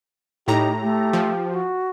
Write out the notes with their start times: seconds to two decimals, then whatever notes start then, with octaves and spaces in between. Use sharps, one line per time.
0.48 A2 D#4 G4 A#5
0.82 A3 G4
1.13 F3
1.51 F#4